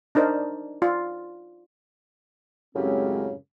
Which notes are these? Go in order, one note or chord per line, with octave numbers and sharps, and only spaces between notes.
D4 D#4 A#4 C5 D5
F4 D5
F#2 A2 C#3 G#3 C4 G4